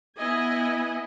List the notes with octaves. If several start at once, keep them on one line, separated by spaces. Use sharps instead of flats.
B3 E4 D#5 G#5